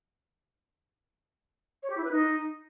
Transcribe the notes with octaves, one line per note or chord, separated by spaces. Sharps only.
C#5
G4
E4
B4
D#4